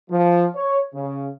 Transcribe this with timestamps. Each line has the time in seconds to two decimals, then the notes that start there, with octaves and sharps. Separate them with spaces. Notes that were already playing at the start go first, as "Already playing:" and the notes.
0.10 F3
0.55 C#5
0.94 C#3